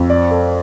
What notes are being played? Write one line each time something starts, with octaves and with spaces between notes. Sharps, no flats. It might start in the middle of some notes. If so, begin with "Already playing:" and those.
Already playing: F2
D5
A4